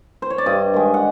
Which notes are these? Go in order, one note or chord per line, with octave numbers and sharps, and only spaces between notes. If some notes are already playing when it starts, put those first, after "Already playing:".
C5
C#5
D5
G2 D#5
D#3 G#3
F#5